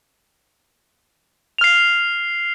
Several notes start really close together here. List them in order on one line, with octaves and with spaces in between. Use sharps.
F7 F6 C7